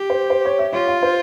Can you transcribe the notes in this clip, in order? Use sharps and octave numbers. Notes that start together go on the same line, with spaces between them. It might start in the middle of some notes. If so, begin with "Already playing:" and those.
Already playing: G4
C5
C5
C#5
E5
F4 C#5
F5
C5